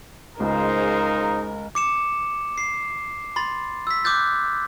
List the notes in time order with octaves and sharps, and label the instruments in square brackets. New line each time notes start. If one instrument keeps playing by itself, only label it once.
[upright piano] C#2 [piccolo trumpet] D#4 [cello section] G#4 C5 F5 [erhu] A#4
[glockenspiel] D6 C#7 E7
C7
B5 C6 A6
E6 B6
D6 D#6 F#6 G6 A6